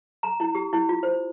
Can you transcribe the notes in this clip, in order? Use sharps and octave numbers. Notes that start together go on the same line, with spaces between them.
A#5
E4
G4
E4
F4
C5